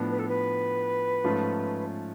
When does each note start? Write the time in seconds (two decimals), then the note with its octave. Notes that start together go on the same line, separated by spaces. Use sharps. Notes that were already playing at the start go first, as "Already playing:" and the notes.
Already playing: A2 F3 B3 D4
0.10 B4
0.19 A4
0.28 B4
1.24 G#2 F3 A3 C#4 F4